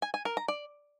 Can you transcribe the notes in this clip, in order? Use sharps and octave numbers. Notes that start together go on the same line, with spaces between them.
G#5
G#5
A#4
A#5
D5